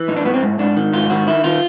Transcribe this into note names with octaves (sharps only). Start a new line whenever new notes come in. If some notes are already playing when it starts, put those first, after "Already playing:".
Already playing: E3
A2 D#4
D4
A2 B3
C4
G#2
G#2 D4
D#3
G#2 F4
D#3 F#4
D#3 E4
D#3 F4